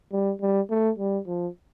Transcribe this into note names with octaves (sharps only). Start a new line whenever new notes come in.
G3
G3
A3
G3
F3